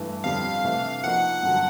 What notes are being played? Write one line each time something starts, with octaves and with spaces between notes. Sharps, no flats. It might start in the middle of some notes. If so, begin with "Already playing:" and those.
Already playing: G2 E3 A3
F2 D3 G3 F5
C3 E3 A3 D4
F3 A#3 D#4 F#4 F#5
G2 D3 F#3